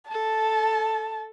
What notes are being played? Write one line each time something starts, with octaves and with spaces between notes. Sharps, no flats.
A4 A5